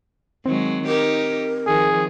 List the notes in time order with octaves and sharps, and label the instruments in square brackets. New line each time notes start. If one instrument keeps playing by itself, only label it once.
[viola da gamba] D#3 F#3 G#3 [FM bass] C4
[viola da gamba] D#4 G4 [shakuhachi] A#4
[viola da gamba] D#3 F3 [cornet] G#4